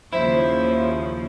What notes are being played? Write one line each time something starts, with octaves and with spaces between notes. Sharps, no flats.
D#2 C#3 F3 E4 C5 E5